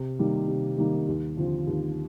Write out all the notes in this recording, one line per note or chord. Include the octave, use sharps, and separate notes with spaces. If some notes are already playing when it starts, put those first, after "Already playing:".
Already playing: C3
D#3 G3 A#3 D#4
C3
D#3 G3 A#3 D#4
D#2
D3 F3 C4 F4
D#2